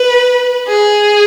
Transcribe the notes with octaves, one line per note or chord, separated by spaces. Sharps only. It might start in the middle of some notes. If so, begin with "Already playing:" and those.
Already playing: B4
G#4